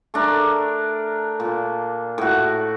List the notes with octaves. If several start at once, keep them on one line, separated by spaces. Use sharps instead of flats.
A3 D4 A#4
A#2
A2 F#4